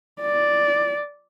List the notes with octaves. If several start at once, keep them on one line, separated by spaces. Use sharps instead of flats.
D5